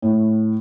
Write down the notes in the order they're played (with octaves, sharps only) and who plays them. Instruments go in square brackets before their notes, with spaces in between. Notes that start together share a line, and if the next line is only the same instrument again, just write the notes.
[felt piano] A2